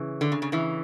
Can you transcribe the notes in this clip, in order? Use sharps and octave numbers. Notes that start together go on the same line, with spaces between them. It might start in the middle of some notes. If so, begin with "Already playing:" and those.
Already playing: C#3 E3
D3
C#3
C#3
C#3 E3